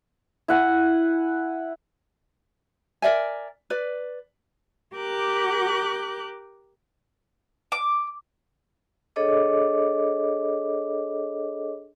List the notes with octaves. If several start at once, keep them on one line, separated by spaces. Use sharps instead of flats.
E4 F#5 G#5
A#4 D5 E5 G#5
B4 D5
G4 A#4 D6 F#6 G6
D6
D4 G#4 A4 C#5 D#5 D6